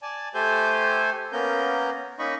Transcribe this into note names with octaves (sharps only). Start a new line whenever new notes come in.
D5 G#5 A5
A3 G4 A4 C5 G#5 G6
A#3 B3 C#4 A#4 G6
A#3 C#4 D#4 D#5 B5 C#6